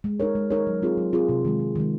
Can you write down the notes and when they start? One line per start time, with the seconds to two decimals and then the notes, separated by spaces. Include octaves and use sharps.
0.04 G#3
0.20 D#4 A#4 C#5
0.35 G#3
0.50 D#4 A#4 C#5
0.67 F#3
0.82 C4 F4 G#4
0.97 F#3
1.13 C4 F4 G#4
1.29 C3
1.45 D#3 G#3
1.60 C3
1.76 D#3 G#3